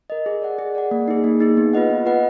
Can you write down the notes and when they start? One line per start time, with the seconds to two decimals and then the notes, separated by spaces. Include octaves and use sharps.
0.10 A#4 D#5
0.26 G#4
0.42 D5 F#5
0.59 G#4
0.75 D5 F#5
0.91 A#3
1.08 D#4 G#4
1.24 A#3
1.40 D#4 G#4
1.57 B3
1.73 F4 B4 D#5 F#5
1.90 B3
2.06 F4 B4 D#5 F#5